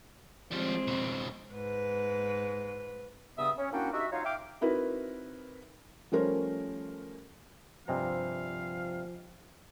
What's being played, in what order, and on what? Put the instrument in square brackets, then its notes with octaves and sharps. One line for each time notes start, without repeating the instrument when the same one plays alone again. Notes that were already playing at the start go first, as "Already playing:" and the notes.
[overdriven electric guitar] F3 G3 [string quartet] G#3 C4
[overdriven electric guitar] F2 B2
[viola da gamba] G#2 B4
[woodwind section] G2 C#3 B3 E5 D#6
C#4
A#3 C#4 D4 E4 F#4 G5
D#4 F#4 G4 E5
F#3 D#4 F4 C#5 F5
E5 F5 G5 D6
[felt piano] C4 D#4 E4 F#4 A#4 B4
F3 G3 A3 C#4 A#4 C5
[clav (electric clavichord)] G2 C3 A#5 [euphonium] F3 [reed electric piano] C5 D#5 G#5 [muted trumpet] F5